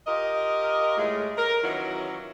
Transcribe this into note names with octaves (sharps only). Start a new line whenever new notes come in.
F4 G4 A#4 D#5
A2 G#3 A3
A#4
D#3 E3 F#3 C#4 E4 F4